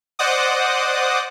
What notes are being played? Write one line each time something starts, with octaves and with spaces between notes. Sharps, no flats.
C5 D5 D#5 F#5 D6 D#6